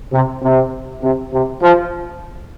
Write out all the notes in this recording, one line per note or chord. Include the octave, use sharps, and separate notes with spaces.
C3
C3
C3
C3
F3